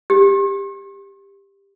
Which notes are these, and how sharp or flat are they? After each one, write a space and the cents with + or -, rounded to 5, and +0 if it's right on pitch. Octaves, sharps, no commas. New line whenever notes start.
G4 +15